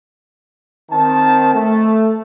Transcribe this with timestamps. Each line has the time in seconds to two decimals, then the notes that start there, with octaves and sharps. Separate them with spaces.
0.91 D#3 C4 A5
1.54 A3